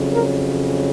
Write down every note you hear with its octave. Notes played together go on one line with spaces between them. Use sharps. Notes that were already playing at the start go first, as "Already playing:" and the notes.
Already playing: F2 C#3 F#3
A#4